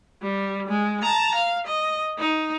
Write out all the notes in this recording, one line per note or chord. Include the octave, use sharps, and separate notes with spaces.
G3
G#3
A5 A#5
F5
D#5
D#4